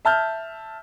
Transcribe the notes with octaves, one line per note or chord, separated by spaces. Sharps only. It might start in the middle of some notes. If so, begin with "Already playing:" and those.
E5 A5 F6 G6